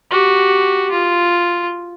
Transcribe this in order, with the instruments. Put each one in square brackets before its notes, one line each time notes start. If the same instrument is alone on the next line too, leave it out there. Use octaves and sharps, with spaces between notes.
[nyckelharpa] F#4 G4
F4